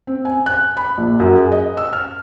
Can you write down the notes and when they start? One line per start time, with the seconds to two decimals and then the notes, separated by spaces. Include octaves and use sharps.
0.07 C4
0.25 G#5
0.46 F#6
0.77 B5
0.98 A#1
1.20 F#2
1.36 G#4
1.52 D#5
1.77 E6
1.93 F6